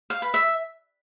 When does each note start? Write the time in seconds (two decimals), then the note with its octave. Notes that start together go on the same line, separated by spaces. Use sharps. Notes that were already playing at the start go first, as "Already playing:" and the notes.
0.10 F5
0.22 B4
0.34 E5